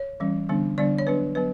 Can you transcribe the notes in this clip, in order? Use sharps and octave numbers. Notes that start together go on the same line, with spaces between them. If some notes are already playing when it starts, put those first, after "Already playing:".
Already playing: C#5
E3 G3 C#4
D3 G3 B3 D4
D3 G3 B3 D4 D5
C#5
F#3 B3 D4 B4
F#3 B3 B4